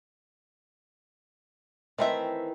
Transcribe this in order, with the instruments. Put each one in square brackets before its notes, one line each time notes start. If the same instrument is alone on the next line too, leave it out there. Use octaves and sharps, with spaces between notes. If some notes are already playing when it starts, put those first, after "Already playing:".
[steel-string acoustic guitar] D#3 E3 [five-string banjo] A3 C4 E5